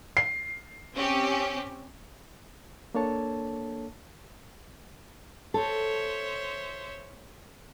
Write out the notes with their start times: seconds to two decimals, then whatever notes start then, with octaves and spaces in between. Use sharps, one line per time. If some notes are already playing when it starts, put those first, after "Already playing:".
0.17 C7
0.93 C4 C#4 G4
2.95 A#3 D4 A4 C#5 A5
5.54 A4 C5 C#5 E5